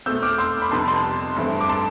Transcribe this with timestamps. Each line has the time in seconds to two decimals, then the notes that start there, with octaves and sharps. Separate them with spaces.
0.06 B2 A3 C4 E6 G6
0.22 D6 F6
0.38 C6 E6
0.62 B5
0.71 F2 C3 G3 B3 A5 C6
0.88 A5 C6
1.36 G2 E3 A3 C4
1.61 D6
1.69 A5 C6